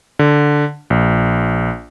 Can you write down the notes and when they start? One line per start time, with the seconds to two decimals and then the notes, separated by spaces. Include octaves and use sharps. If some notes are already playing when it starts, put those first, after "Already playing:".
0.19 D3
0.90 A#1